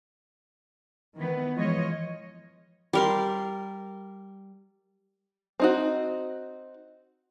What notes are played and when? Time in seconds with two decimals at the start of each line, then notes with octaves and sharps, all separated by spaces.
1.15 D#3 E3 B3
1.55 E3 F3 G#3 F4 C#5 D#5
2.93 G3 A#4 C6
5.60 C4 D#4 F#4